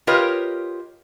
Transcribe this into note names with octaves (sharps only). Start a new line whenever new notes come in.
F4 G4 A#4 B4 C#5 D#5